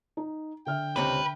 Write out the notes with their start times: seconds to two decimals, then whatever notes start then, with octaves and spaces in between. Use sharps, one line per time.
0.17 D#4
0.66 D3 E5 G5 F6
0.96 C#2 C3 C4 B4